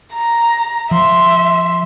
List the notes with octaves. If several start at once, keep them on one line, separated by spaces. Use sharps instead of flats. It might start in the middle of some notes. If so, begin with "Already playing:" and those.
A#5
F3 E5 C6